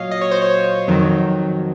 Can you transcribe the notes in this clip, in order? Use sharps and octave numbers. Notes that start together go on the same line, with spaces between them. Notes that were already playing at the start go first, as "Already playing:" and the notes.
Already playing: A#2 F#3 C#5 D#5 F5
D#5
C#5
C5
C#5
F2 D#3 F#3